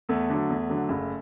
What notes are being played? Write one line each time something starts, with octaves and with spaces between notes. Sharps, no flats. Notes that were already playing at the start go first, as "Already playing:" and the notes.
E2 A3
D3 F#3
E2
D3 F#3
F#1